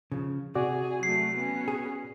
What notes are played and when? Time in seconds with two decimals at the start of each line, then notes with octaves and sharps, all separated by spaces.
0.12 C#3 F3
0.55 C3 F#4 G#4 D5
1.03 F#3 A3 C7
1.36 B3 C#4
1.68 G#4